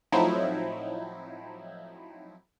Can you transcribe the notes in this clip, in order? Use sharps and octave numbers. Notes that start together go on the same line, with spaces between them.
A2 F3 F#3 C4 D#4 E4